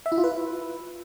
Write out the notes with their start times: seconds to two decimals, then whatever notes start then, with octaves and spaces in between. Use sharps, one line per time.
0.06 E5
0.12 E4
0.18 F4
0.24 B4